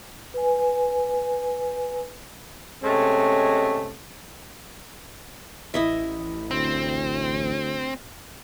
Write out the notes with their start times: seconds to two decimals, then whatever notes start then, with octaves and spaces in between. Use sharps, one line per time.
0.34 B4 G#5
2.83 C3 G#3 A3 C#4
5.74 A1 E4 D#5 E5
6.51 D2 C4